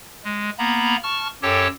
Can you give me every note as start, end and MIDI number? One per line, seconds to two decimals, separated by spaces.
0.24 0.50 56
0.58 0.96 58
0.58 0.96 59
0.58 0.96 82
0.58 0.96 83
1.03 1.28 81
1.03 1.28 85
1.03 1.28 89
1.42 1.67 42
1.42 1.67 67
1.42 1.67 69
1.42 1.67 73
1.42 1.67 79
1.42 1.67 81